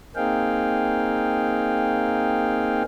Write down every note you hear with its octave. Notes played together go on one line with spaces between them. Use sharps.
A#3 C4 D#4 G#4 F5 G5